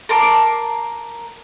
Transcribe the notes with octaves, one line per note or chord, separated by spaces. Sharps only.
A#4 A5 C6 D6